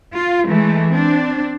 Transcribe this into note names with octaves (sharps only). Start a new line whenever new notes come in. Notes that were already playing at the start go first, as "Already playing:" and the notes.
F4
E3 G#3 A3
C4 D4